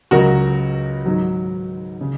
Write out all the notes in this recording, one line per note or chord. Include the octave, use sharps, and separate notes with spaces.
C#2 C#3 F#3 F#4 A#4
G#2 D#3 F#3
C#3